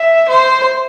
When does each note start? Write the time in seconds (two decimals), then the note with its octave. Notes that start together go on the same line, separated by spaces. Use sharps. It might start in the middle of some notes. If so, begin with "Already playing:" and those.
Already playing: E5
0.29 C5